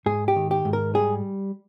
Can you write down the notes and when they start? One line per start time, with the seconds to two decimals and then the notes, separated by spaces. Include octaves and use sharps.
0.06 G#2 G#4
0.28 G4
0.36 D#3
0.51 G4
0.65 G#2
0.73 A#4
0.95 G3 G#4